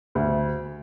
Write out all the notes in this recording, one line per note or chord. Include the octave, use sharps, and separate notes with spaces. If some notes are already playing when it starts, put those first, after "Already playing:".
D2